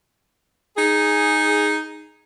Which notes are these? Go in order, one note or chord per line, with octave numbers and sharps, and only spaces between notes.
D#4 G#4